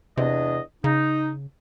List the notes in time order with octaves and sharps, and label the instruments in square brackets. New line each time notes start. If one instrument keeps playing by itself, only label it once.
[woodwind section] E2 D4 D#5 [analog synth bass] C3
[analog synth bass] C#3 [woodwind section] D#4